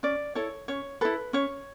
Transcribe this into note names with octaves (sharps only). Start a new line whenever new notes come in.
C#4 D5
E4 A4 C#5
C#4 C#5
E4 A4 B4
C#4 C#5